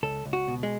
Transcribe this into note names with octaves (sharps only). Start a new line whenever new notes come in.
C#2 A4
C#2
F#4
B2
G#3